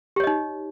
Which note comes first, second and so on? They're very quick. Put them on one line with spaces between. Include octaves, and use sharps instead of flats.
G4 C#5 D#5 D#4